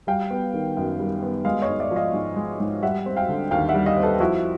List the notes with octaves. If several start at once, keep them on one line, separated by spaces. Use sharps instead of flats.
G3 F5 G5
B3
D#3
F#2
G3
B3
G#3 D#5 F5
C#5 D#5
G#2
D5 E5
F3
D#5 F5
G#2
G#3
G#2
G3 E5 F#5
C4
F5 G5
D3
D#2 F5 G5
E5 F#5
G3
D#5 F5
C4
A4 B4
F3 E4 F#4